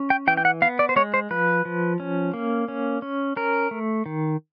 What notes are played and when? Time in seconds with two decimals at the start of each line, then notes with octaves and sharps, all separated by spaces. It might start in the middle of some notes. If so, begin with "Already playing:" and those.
Already playing: C#4
0.10 G5
0.27 E3 G5
0.37 G5
0.45 F#5
0.62 B3 F5
0.79 D5
0.89 C5
0.96 G#3 C#5
1.14 C5
1.31 F3 B4
1.65 F3
2.00 C#4
2.34 A#3
2.68 C#4
3.02 C#4
3.36 C#4 A#4
3.71 A3
4.06 D#3